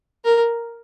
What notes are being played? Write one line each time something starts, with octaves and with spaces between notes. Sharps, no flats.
A#4